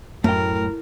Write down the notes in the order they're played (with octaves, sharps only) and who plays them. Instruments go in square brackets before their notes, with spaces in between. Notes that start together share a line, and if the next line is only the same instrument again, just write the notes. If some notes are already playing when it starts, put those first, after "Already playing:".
[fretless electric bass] F#2 [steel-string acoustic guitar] A2 [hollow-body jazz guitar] A3 G5 [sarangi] A#4